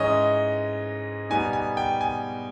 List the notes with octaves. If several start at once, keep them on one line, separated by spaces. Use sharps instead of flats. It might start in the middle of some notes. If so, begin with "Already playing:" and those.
Already playing: G#2 E3 G#3 C#4 C#5 D#5
B2 G3 B3 D#4 G#5
G#5
G5
G#5